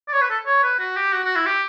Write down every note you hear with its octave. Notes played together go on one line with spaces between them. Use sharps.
D5
C#5
B4
A4
C#5
B4
F#4
G4
F#4
F#4
E4
G4